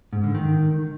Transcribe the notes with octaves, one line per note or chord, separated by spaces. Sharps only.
G#2
D3
D#3